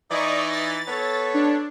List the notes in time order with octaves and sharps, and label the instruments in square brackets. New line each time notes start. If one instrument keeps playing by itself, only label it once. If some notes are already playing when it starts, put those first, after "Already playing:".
[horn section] E3 D#4 [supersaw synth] D5 D#5 C#6
[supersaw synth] A6
[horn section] B3 A4 C#5
[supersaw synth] D4